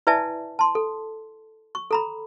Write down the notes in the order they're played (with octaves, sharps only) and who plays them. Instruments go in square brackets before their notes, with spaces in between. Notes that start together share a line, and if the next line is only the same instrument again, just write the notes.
[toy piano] E4 B4 D5 E5 G#5 A5
A5 C6
A4
C#6
A4 A#5 B5